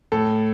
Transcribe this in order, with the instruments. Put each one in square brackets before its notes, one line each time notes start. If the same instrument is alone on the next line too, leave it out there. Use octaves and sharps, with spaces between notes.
[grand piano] A2 A4